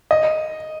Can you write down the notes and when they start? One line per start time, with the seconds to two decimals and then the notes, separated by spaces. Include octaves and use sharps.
0.11 D#5